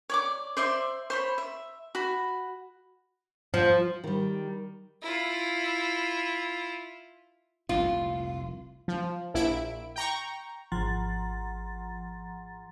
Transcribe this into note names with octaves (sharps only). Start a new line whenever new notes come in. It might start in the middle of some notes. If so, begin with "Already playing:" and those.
C#5 D5 D6
C5 D5 E5 C6
C5 C#5 B5
E5
F#4 B5
F3
D#3 G3
E4 F4
F1 C2 A#2 F4
F3
A#1 E4 D7
G5 A#5 C#6
G#1 F3 F#5 A#5 C6 A6